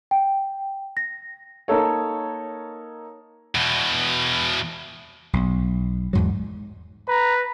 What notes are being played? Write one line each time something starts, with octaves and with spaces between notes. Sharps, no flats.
G5
A#6
A#3 D#4 A4 C#5
E2 B2
B1
E2 G#2 F#3
B4 A#5